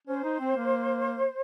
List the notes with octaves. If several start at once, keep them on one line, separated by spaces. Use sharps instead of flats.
C#4 C5
D#4
C4
A#3